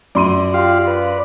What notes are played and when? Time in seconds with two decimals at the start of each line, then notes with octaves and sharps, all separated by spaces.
0.15 F#2 D5 C6 D#7
0.54 F4 G4 F5
0.87 B4